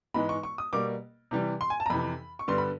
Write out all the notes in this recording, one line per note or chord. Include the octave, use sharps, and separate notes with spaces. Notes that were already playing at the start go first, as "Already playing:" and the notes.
G#2 E3 G#3 B3 B5
C#6
C#6
D#6
B2 G3 A#3 D6
C3 E3 G3
C6
G#5
A5
A#5
F2 C3 E3 B5
C#6
G2 D3 G3 B3 C6
B5